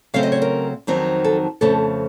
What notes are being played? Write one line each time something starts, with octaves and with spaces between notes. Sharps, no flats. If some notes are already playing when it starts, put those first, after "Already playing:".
C#3 F#3 A3 C4 F5
D#5
C#5
A#4
F2 D#3 F#3 C4
A4
F2 C#3 A3 C4 A4